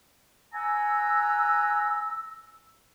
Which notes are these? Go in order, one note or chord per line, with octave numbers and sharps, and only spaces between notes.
F#5 G#5 A#5 E6